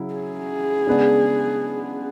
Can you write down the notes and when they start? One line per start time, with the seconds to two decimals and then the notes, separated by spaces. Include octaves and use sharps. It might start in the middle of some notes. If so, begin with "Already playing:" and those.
Already playing: C#3 F#3 E4
0.14 G#4
0.87 C#3 G#3 B3 D4